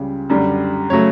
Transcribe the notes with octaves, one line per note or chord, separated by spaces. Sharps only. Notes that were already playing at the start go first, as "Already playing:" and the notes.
Already playing: C#2 C#3 G3
F#2 D3 G3
C#3 F#3 A3 C#5